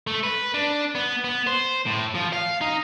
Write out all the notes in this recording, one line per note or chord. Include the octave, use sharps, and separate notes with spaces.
A3
B4
D4
B3
B3
C5
A2
F3
F5
D#4